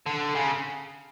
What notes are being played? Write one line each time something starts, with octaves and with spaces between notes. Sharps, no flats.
D3
C#3